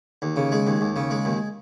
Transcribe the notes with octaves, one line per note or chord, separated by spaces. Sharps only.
D#2
C#3
G#3
D#2
D#2
C#3
G#3
D#2